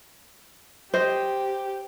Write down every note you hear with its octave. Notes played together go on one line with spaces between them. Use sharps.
G4 C5 D#5